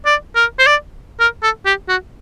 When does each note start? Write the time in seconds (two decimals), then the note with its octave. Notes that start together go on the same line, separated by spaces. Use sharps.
0.06 D5
0.35 A#4
0.59 C5
0.66 D5
1.20 A#4
1.43 A4
1.66 G4
1.89 F#4